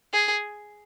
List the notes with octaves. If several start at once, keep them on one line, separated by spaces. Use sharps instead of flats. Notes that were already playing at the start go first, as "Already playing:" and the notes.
G#4